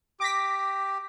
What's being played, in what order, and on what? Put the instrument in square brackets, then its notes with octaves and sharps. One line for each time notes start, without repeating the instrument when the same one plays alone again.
[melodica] G4 [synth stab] D6 A#6 B6